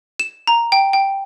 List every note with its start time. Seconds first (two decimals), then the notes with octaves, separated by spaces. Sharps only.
0.20 E7
0.47 A#5
0.72 G5
0.93 G5